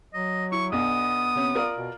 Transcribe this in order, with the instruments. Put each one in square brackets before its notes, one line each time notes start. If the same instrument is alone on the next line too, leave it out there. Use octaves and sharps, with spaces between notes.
[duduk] F#3 [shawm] D#5
[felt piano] E4 [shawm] C#6
[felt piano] B1 D4 [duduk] B3 [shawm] D#6
[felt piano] C3 C#4
F4 A#4 D5
[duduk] B2